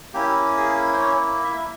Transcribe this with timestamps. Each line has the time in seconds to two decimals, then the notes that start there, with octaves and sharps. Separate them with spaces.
0.13 A#3 C#4 E4 G4
0.57 G#4
0.93 C5
1.00 C#4 C#5
1.43 E4 E5